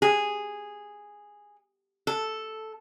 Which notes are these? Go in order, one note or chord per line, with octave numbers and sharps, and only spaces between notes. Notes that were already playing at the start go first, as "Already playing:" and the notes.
G#4
A4